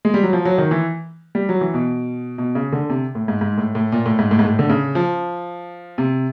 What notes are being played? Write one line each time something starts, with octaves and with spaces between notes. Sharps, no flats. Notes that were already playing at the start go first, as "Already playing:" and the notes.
G#3
G3
F#3
F3
F#3
D#3
E3
G3
F#3
E3
B2
B2
C#3
D3
C3
A2
G#2
G#2
A2
A2
A#2
A2
G#2
A2
G#2
A2
D3
C#3
F3
C3